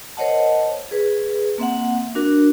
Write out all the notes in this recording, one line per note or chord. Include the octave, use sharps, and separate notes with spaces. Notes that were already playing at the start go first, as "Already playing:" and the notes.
A#4 C5 C#5 D#5 F#5 A5
G#4 B4
A#3 C4 E5 F#5
D4 F#4 A#4